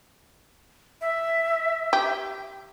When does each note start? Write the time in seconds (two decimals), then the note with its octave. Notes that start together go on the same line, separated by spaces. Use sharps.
1.01 E5
1.93 G4